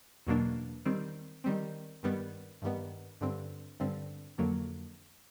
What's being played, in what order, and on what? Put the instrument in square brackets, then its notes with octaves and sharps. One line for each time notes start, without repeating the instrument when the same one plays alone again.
[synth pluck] E2 B2 F#3 A#3 D4
D#3 G3 C4
D#3 G3 C4
G2 D#3 G3 B3
G2 D#3 G3 B3
G2 D3 G3 C4
G2 D3 G3 C4
F2 D3 F#3 A#3